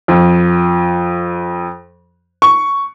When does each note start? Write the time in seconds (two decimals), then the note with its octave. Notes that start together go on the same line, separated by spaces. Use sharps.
0.08 F2
2.42 C#6